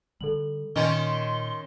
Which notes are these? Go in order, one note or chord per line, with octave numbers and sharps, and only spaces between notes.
D3 G3 A4 F#7
A#2 D#3 C#4 D#5 C6